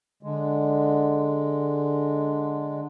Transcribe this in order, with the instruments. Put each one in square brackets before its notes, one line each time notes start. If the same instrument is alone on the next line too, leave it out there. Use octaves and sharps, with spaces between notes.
[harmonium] D3 G#3